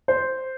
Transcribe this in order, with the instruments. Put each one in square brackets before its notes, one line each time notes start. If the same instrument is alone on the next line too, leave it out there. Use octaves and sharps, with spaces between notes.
[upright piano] C5